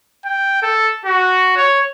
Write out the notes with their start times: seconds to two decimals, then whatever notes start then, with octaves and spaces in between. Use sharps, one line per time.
0.25 G5
0.62 A4
1.05 F#4
1.56 C#5